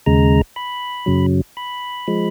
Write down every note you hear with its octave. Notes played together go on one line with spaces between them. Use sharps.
D#2 C#3 G#3 A#5
B5
F#2 C#3 F#3
B5
F3 G#3